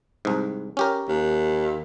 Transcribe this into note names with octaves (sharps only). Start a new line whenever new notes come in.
C2 G#2
C#4 G4 A#4
D#2